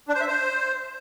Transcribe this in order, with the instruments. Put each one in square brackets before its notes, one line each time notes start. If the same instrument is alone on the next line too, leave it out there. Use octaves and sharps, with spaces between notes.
[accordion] D4
C5
E5
C5